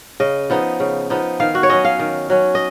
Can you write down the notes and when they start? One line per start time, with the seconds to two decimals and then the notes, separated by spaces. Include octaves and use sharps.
0.20 C#3 D#5
0.50 F3 B3 D#4
0.80 C#3
1.10 F3 B3 D#4
1.40 D#3 F5
1.55 F#4
1.63 C#5
1.69 F#3 C#4 D#5
1.85 F5
1.99 D#3
2.30 F#3 C#4
2.55 D#5